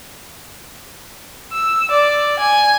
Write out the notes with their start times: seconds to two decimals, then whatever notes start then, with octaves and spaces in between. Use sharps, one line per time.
1.52 E6
1.91 D5
2.39 G#5